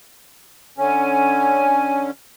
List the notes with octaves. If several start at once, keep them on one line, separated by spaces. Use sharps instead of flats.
D3 C#4 C#5 G#5